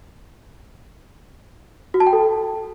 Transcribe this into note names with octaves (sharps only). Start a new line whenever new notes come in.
F#4
A5
G5
A4